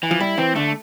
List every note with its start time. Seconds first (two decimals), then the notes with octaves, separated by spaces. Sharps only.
0.03 E3
0.11 F3
0.20 G3 E4
0.38 E3 C4
0.55 D3 A3